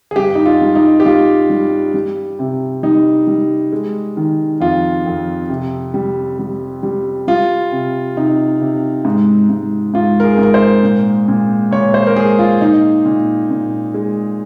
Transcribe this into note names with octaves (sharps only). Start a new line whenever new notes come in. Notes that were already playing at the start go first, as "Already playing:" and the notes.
G#4
G2 G4
D#4
F4
G3
D#4
G4
G3 F4
G3
G3
C3
G3 D#4
G3
G#3
D#3
F2 F4
F2
C3
G3
G3
G3
G3 F4
C3
C3 D#4
C3
G#2
G#2
G#2 F4
A#4
G#4
G#2 A#4
C5
A#2
A#2
A#2 C#5
C5
A#4
G#3 G#4
F4
A#2 D#4
A#2
A#2
G#3